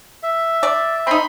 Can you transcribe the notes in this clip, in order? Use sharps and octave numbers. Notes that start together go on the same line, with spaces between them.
E5
D5
C4 D#4 B5 C6